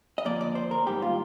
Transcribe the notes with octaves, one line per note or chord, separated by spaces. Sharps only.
D#5
F2 D3 F3 A#3 D5
D5
C5
A#4
G#2 D#3 G3 A#3 G4
F4